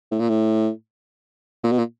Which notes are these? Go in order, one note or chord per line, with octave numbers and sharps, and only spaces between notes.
A2
A#2
A2
A#2
B2
A#2